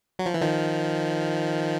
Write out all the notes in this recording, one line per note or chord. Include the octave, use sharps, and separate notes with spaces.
F#3
F3
E3
D#3 F3